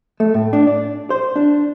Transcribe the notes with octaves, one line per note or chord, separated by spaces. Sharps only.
A3
A2
D4
D5
C5
D4